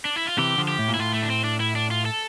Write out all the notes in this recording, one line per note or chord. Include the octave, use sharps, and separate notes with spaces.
D4
E4
F4
C3 E3 G4
D3 F3
G4
A2
A#2
E4
A2 F4
A3
D4
C4
D4
E4
D4
F4
A4